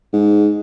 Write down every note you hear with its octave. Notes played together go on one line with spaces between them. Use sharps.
G#2